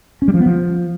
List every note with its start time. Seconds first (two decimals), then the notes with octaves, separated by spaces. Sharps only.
0.22 C#4
0.28 G3
0.34 F3
0.40 B3
0.46 F3